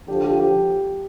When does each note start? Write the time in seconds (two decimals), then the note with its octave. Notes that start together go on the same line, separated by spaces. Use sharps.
0.08 D3 F3 G4
0.24 G4
0.39 G4